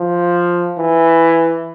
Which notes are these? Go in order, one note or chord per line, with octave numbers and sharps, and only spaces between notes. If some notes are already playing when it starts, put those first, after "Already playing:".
Already playing: F3
E3